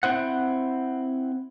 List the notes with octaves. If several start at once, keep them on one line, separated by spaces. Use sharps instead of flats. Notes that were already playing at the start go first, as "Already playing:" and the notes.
C4 E4 C5 F#5